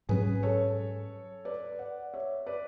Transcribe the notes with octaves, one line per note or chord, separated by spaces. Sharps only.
G#2 F#3 C#4 G#4 B4
A4 C#5
B4 D5
D5 F#5
C#5 E5
B4 D5